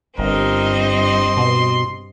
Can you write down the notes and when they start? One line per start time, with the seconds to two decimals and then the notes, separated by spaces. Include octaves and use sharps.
0.18 G1 G2 C4 A#4 D#5
0.81 C6
1.37 B2